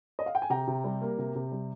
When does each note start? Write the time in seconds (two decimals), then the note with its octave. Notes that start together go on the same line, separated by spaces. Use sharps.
0.19 D#5
0.26 F5
0.35 G5
0.42 G#5
0.50 C3 G5 A#5
0.68 C3
0.84 G3
1.01 A#3
1.19 C3
1.35 C3
1.51 G3